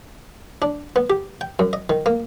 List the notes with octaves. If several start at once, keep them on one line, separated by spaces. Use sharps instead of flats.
D4
B3
G4
G5
F#2
D#5
D#3
A#3